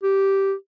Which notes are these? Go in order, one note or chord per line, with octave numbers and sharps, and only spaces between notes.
G4